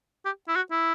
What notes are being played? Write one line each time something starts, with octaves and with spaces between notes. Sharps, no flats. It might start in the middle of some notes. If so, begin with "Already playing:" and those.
G4
E4
F#4
E4